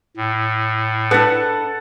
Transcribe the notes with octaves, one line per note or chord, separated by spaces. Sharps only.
A2
D4 A4 B4 F#5 A5